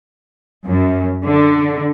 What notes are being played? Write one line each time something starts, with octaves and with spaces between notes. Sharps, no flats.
F#2
D3